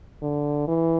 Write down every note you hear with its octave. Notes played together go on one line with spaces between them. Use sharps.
D3
E3